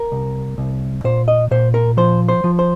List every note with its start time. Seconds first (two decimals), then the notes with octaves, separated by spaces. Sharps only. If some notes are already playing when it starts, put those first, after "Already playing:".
Already playing: A#4
0.12 C2
0.58 C2
1.04 A#2 C5
1.28 D#5
1.51 A#2 C5
1.74 A#4
1.97 F3 C5
2.29 C5
2.44 F3
2.59 C5